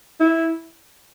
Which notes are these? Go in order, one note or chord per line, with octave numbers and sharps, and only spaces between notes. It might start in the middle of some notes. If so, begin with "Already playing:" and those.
E4